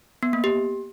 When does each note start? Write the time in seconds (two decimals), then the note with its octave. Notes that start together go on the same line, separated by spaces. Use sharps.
0.23 B3
0.33 A#3
0.44 G4